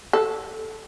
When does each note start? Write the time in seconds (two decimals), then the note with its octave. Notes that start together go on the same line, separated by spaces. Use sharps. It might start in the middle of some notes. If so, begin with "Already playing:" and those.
0.13 A4